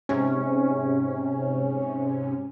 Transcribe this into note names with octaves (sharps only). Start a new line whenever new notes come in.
G#2 C3 C#4